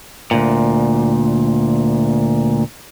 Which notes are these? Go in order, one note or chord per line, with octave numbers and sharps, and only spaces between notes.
D2 A#2